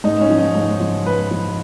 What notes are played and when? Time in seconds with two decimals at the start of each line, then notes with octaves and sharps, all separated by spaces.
0.04 G#2 D#4
0.21 C#4
0.30 F3
0.38 D#4
0.55 G#2
0.80 F3
1.05 G#2 B4
1.31 F3